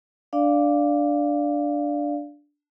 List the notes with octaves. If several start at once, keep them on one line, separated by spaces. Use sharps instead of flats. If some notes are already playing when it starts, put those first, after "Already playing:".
D4 D5 F5